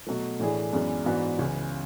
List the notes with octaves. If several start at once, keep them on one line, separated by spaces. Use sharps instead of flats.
B2 F#3 A3
A2 E3 A3 D4 G#4
F#2 E3 G#3 B3 D4
G#2 E3 B3 D4 F#4
C#2 C#3 E3